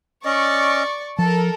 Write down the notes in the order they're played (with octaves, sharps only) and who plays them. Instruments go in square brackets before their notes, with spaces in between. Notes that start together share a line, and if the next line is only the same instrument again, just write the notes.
[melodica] C#4 D#5 [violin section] D5 C#6
[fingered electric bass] F3 [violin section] A4 A#4 [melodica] A5